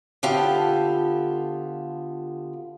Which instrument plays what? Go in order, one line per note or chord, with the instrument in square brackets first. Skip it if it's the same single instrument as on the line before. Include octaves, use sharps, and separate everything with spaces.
[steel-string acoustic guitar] D3 B3 F4 G4 A4